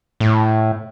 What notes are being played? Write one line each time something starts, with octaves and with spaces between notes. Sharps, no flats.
A2